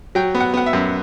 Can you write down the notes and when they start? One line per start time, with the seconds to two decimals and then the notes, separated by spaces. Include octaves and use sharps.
0.15 F#3 G5
0.35 B3
0.40 F#5
0.54 B3 F#5
0.66 E5
0.73 F#2